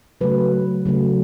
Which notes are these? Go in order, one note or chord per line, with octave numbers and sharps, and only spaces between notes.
C#3 F#3 A3 B4
C#3 F#3 A3